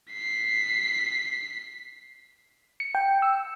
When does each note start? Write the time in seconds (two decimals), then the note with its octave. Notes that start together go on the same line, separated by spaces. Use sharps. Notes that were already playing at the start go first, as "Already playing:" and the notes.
0.12 B6 C7
2.80 C#7
2.95 G5
3.22 E6